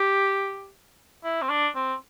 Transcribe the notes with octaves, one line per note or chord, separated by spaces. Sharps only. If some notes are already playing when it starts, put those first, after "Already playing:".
Already playing: G4
E4
C4
D4
C4